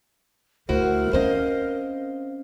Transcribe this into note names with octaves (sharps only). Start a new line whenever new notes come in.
D2 E4 F#4 A#4 C5
C4 C#4 C5 D#5 F5